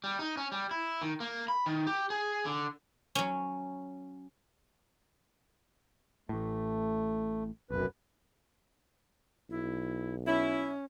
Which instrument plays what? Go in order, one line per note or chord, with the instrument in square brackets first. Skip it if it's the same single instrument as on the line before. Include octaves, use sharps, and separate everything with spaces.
[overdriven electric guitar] G3
D#4
C#4
G3
E4
D#3
A#3
B5
D#3
G4
G#4
D3
[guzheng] F#3 C#4
[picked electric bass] A1 A2 [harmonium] A3
[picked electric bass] F1 B1 [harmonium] F#2 B4
[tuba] B1 [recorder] E4
[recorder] C#4 [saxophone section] E4